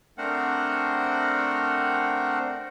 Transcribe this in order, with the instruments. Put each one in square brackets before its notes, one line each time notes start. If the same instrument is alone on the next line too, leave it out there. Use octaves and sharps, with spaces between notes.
[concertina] A3 C4 D4 A#4 C5 F#5